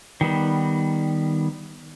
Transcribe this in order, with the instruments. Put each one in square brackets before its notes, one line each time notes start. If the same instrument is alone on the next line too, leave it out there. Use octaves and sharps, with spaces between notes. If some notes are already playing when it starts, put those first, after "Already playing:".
[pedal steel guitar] D#3 G3 B3